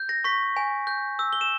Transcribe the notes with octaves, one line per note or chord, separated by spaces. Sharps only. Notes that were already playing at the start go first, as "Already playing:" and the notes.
Already playing: G6
A#6
C#6 B6
G#5
G6
E6
G7
E7